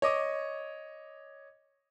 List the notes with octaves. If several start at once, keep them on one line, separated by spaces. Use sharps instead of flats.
C#5 D#5 D6